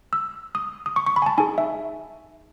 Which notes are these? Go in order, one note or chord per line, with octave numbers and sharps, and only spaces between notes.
E6
D#6
D#6
C#6
C#6
B5
G#5
A5
D#4 G#4 G#5
E5